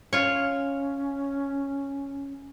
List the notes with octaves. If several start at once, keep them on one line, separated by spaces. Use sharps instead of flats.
C#4 F4 C#5